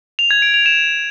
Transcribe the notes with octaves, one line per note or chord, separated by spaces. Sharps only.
F7
G#6
D7
F7
E7